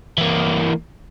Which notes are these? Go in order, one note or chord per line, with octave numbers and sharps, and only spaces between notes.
E3 A#3